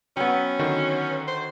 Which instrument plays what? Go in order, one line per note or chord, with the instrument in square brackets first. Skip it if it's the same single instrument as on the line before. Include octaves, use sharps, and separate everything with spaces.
[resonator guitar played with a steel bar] F#3 B3 [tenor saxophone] C#4 [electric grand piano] G5
[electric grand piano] D3 D#3 F#4
[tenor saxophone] C5